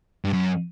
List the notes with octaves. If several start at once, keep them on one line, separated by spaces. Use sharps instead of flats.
G2
F#2